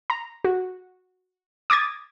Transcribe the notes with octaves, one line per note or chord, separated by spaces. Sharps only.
A#5
F#4
D6 D#6 G#6 A6